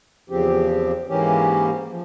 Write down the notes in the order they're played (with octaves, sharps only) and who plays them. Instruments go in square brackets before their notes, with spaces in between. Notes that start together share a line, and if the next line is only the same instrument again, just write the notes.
[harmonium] E2 C#3 F3 C4 G4
G#2 E3 A#3 C#4 G4
F3